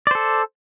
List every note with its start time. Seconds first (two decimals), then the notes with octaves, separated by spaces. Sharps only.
0.07 D5
0.11 C5
0.15 A4